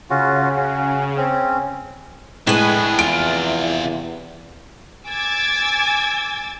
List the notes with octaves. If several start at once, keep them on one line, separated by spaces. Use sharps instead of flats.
C#3 C#4 F4 F#4
C#4 F#4
C4 C#4
A2 C3 G#3 D4 B4 G#5
E2 F4 D7
G#5 D6 E6 G#6 A6